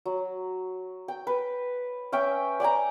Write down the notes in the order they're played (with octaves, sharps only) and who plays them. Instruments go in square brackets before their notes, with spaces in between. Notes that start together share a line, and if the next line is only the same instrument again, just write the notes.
[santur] F#3
G5
B4
C#4 E5 G5
D5 G5 G#5 A#5